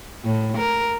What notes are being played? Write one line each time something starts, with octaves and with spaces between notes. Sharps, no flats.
A2
A#4